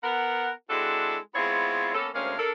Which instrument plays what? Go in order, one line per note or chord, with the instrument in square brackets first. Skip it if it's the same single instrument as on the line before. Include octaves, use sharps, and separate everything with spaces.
[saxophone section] B3 A#4 F#5
G#3 C4 D4 E4 F#4 A4
G#3 B3 C4 E4 F4 C#5
A#3 B3 C#4 A4
D2 G#3 A#3 C4 C#4 F5
D4 A4 A#4